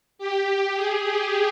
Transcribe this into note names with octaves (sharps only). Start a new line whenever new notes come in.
G4
G#4
G4